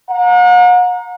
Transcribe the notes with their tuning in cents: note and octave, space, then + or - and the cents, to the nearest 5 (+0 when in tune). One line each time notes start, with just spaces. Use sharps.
F#5 -45 A#5 +5